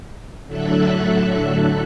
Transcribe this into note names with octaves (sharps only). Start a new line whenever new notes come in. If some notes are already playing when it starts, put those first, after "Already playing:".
A2 D3 F#3 A4 E5 F#6